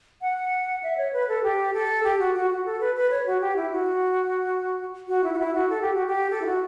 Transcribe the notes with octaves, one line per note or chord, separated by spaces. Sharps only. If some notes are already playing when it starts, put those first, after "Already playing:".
F#5
E5
C#5
B4
A4
G4
A4
G4
F#4
F#4
F#4
A4
B4
B4
C#5
F#4
G4
E4
F#4
F#4
E4
F#4
E4
F#4
A4
G4
F#4
G4
A4
E4
F#4